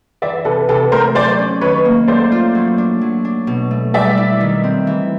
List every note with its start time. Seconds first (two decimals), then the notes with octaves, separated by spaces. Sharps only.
0.22 E3 D5 E5
0.45 C3 A4 B4
0.69 C3 A4 B4
0.92 A3 A#4 C5
1.15 F#3 C5 D5
1.39 C#4
1.61 D#3 B4 C#5
1.85 A#3
2.08 A3 C5 D5
2.32 F4
2.55 F#3
2.78 D4
3.01 F#3
3.25 D4
3.47 B2
3.71 A3
3.94 G3 D5 E5
4.17 E4
4.41 D#3
4.64 C4
4.87 E3